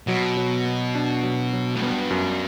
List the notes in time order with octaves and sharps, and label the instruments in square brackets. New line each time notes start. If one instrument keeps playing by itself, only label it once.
[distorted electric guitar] B2 [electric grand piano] F#3
[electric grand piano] F#3
B3
D4
F#3
F#3
[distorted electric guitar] A2
[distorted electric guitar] G2 [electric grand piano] B3
[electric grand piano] F#2